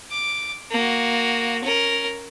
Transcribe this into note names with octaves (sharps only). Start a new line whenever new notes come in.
D6
A#3 F#4
C#4 A#4